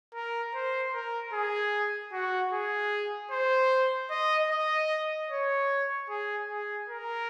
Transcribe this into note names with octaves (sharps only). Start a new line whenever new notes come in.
A#4
C5
A#4
G#4
F#4
G#4
C5
D#5
D#5
C#5
G#4
G#4
A#4